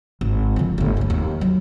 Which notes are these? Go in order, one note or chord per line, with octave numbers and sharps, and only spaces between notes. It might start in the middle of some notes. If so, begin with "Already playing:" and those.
G#1
D3 F3
G1 A2
C#3 A#3
D#2
F#3